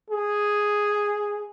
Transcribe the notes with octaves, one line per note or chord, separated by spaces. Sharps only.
G#4